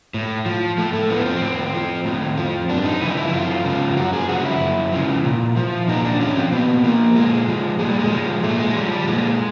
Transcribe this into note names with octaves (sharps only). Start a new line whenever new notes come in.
A2
F3
A2 A3
A3
F3 B3
C4
A2
F3
A2
F3
F#2 D4
D#4
C#3 F3 E4
E4
F#2 F4
C#3 F3
F#2 F#4
G#4
C#3 F3 F#4
E4
F#2
C#3 F3
A#2
F3
A#2 D#4
D4
F3 C#4
C4
A#2 B3
F3 A#3
A#2 G#3
F3
A#2 G#3
G3
G#3
F3
A#2 A3
G#3
F3 G3
G3
A#2 G#3